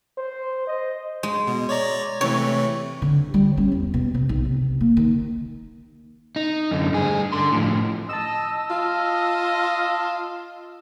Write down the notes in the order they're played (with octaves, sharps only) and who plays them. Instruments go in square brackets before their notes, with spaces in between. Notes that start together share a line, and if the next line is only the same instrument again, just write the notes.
[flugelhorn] C5
D#5
[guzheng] G#3
[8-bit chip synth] B2
C#5 D5 A#5
[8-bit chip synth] C3 E3 A3 [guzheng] C#5
[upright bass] D3
G3
C#4
E2
B2
C3
B1
C3
A#3
D#3
[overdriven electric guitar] D#4
F#2 D3
G2 G#4
D3 C6
A2 F3
[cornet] D#5 [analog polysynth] A5 E6
[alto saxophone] F4 [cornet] D#5